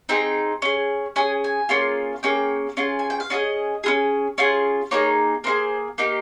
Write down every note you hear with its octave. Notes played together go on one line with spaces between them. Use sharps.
C4 D#4 G#4 G5
C#4 G#4
C#4 G#4 G#5
G#5
A#3 C#4 F4 G#4
A#3 C#4 G#4 G5
C#4 F4 G#4
G#5
G5
F5
C#4 F4 G#4 D#5
C#4 F4 G#4
C#4 F4 G#4
A#3 D#4 G#4 C#5
A#3 D#4 G#4 C5
A#3 D#4 G4